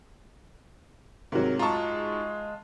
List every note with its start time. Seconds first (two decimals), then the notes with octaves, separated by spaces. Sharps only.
1.32 G#2 C3 F#3 F#4 A#4
1.59 G#3 F4 A5 A#5 C#6